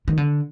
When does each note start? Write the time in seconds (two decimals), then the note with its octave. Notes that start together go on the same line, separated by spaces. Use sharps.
0.08 D#3
0.17 D3